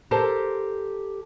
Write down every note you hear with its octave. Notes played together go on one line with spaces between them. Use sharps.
G4 A4 A#4 C5 A5